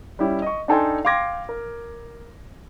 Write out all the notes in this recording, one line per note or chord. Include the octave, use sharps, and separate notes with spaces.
G3 C#4 E4 G4
D#5 C#6
D4 D#4 A4 G5 G#5 C6
F5 G5 C6 D6 G#6 A#6
A#4